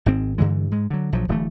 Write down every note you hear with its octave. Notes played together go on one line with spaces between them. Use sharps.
G#1 G#2 C4
G2 D3 E3 G#3
G#2 G#3
D3 F#3
A#1 F3 F#3
D1 E3 G3 A3